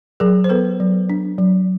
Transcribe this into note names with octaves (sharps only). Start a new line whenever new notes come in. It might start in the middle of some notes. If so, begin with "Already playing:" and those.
F#3 G#4 A#4
C5
B3 A4 B4
F#3
D4
F#3